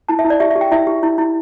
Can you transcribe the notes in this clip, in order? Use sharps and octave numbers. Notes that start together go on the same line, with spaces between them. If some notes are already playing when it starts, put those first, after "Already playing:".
E4 A5
E5
E4
D5
G4 E5
E5
G4
G5
E4 E5
G4
E4
E4